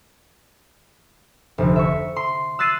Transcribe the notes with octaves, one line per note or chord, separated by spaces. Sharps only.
F1 D2
E5 C#6
C6
E6 F#6 A6 C7 D#7